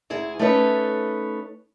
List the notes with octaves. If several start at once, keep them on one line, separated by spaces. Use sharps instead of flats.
D2 E4 G#4
A3 C#4 D#4 A4 B4 C#5